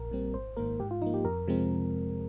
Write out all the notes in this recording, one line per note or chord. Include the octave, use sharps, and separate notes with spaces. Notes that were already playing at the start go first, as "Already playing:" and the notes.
Already playing: A#1 A#4
A#2 G3 C4
G#1 C5
G#2 D#3 A#3 A#4
G#2 G4
F4
F3 A#3 D#4
G4
F2 A#4
C3 F3 G#3 C4